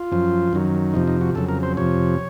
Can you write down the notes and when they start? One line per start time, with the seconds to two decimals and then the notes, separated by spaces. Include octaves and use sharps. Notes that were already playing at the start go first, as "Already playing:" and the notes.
Already playing: F4
0.12 F#2 F3
0.53 F#2 D#3 F#3
0.94 F2 C3 F3 D#4
1.07 D#4
1.21 F#4
1.35 F2 C#3 F#3 A4
1.49 A#4
1.63 C5
1.77 F2 C3 F3 C#5